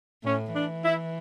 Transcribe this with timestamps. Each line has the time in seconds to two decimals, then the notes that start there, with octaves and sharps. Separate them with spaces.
0.24 A2 C#4
0.54 E3 D4
0.85 E4